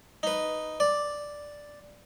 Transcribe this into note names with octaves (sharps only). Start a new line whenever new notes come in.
D#4 B4
D5